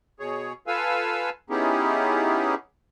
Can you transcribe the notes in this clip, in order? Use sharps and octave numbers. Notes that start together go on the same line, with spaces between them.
B2 G#4 C#5
F4 A4 B4 F5 G#5 E6
B3 C#4 D#4 E4 G4 G#4